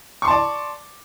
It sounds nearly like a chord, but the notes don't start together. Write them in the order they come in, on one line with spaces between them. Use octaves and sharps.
C#6 C6 A5 D5